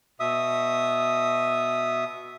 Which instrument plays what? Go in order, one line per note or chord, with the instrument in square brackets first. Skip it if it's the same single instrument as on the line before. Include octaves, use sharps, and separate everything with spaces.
[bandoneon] B2 E5 D#6